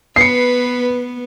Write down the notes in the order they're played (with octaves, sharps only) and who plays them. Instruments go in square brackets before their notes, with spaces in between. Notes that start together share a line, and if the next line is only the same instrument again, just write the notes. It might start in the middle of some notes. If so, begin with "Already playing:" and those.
[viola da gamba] B3 [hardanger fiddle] B4 [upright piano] C7 C#7